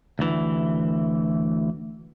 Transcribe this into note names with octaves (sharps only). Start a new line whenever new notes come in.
D2 E3